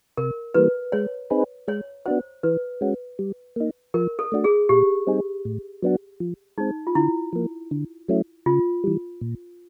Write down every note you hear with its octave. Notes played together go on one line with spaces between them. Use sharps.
C3 A#4
E3 G3 A#3 B4
G#3 C#5
C4 D#4 G#4 B4
G#3 C#5
B3 D4 F#4 C5
E3 B4
G#3 C#4 F#4
G3
A#3 D#4
F3 A#4
A4
A3 D4 F#4
G#4
A#2 G4
G3 C4 D#4 G#4
A2
F#3 B3 D4 F#4
F3
G#3 C4 D#4
F4
D3 E4
F3 A#3
D3
F#3 A3 C#4 E4
C#3 F4
E3 G3
A#2